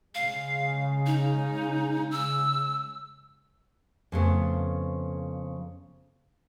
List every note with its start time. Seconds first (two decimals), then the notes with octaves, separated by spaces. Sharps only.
0.15 C#3 G#3 F5
1.06 D#4
2.11 E6
4.12 F2 C#3 A3 B3